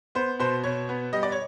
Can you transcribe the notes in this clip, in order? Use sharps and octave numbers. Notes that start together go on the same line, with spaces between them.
B3 C5
B2 C5
B2 C#5
B3
G3 D#5
D5
C#5